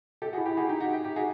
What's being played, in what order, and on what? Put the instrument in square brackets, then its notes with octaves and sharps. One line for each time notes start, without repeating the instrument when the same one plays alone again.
[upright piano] G4 A4
F#4 G#4
[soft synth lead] E4
[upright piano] G4
[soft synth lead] E4 [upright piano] F#4 G#4
[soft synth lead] D#4 [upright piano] G4
[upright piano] F#4
G4
G4
F#4 G#4